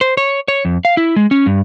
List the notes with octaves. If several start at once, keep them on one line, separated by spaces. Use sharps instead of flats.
C5
C#5
C#5
F2
F5
E4
G#3
C#4
G2